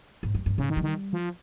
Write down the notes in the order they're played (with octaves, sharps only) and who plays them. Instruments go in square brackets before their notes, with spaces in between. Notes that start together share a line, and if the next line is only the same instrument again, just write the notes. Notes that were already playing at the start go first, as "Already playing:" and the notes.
[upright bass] G#2
G2
G2
[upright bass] G#2 [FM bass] C#3
[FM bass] D#3
[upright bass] G3
[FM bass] D#3
F3